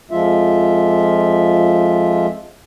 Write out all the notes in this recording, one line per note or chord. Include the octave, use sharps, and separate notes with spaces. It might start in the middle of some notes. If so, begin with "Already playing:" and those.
F2 F3 G#3 F4 E5